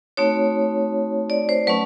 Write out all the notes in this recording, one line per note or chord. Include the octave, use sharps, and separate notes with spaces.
A3 C4 D#4 F#4 C#5
D5
C5
F#3 A3 C#4 B4